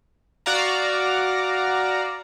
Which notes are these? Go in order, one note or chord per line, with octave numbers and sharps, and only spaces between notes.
F#4 D5 F5 A#5